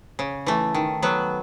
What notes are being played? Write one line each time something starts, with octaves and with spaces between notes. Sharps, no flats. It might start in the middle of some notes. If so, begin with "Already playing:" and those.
C#3
E3 A3
D#3
F#3 B3